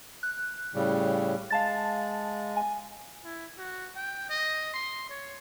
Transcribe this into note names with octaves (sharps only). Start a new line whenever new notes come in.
F#6
A2 C#3 G3
G#3 F5 A5 A6
G#5
E4
F#4
G5
D#5
C6
C#5